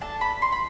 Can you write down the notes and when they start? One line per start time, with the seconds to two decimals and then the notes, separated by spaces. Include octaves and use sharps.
0.01 D4 A4 A5
0.21 B5
0.42 C6
0.52 B5